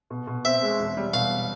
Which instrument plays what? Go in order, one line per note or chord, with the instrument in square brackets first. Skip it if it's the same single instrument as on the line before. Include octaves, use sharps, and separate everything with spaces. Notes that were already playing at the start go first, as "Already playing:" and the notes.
[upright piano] B2
B2
[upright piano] C4 [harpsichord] E5
[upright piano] G#3
E1
G3
[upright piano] B2 [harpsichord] F5